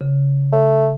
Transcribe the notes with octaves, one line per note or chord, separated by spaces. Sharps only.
C#3
A3